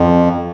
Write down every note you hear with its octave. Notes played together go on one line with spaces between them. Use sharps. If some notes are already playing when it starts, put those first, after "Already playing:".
Already playing: F2